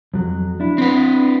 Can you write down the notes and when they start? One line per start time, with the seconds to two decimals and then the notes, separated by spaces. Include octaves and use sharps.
0.14 F2 F#3
0.60 D4 E4
0.78 C4 B4